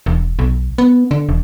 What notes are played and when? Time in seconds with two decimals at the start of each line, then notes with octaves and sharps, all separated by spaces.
0.06 E1
0.39 B1
0.78 B3
1.11 D3
1.29 E1